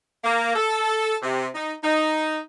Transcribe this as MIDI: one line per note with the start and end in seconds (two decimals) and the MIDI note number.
0.24 0.53 58
0.55 1.14 69
1.22 1.47 48
1.54 1.74 63
1.83 2.38 63